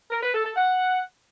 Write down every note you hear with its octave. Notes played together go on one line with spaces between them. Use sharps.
A#4
B4
A4
A4
F#5